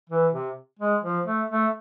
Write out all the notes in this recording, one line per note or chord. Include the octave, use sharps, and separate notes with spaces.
E3
C3
G#3
F3
A3
A3